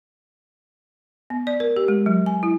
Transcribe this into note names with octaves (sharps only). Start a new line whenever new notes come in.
B3
D5
A#4
G4
G#3
F#3
G#5
E4